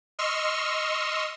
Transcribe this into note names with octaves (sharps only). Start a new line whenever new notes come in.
D#5 C6 C#6 E6 F6